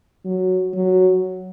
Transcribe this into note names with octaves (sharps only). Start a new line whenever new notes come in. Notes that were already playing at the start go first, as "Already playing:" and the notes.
F#3
F#3